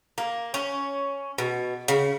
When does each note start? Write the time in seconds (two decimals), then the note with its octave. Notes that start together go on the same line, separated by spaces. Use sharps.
0.18 A#3
0.54 C#4
1.38 B2
1.88 C#3